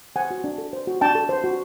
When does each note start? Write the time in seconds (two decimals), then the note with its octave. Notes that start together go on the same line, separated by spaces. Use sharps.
0.16 C5 F#5 G#5
0.31 F#4
0.44 D4
0.58 A4
0.73 C5
0.87 F#4
1.01 D4 G5 A5
1.15 A4
1.29 C5
1.44 F#4